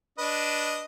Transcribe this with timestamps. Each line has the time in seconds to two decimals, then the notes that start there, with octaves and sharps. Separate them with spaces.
0.18 D4 B4 D#5